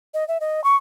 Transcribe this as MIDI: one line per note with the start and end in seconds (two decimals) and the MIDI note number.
0.14 0.27 75
0.28 0.38 76
0.41 0.64 75
0.64 0.76 85